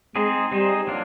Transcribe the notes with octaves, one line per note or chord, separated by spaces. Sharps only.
G#3 C4 D#4 G#4 C5
G3 C4 D#4 G#4 C5
F#3 A#3 D4 F4